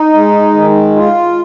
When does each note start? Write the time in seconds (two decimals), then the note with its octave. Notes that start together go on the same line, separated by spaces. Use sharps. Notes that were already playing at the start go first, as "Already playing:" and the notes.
Already playing: D#4
0.13 G#3
0.54 D#3
0.95 F4